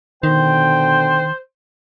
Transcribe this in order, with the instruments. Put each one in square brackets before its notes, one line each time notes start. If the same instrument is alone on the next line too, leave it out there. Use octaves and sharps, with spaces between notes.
[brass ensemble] B2 D3 G5 [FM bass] D#3 [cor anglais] C5